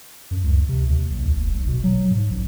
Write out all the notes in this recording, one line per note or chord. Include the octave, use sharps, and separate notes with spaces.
F#2
C#2
C3
D#2
B1
D#2
F1
B1
B2
F#3
G#2
A1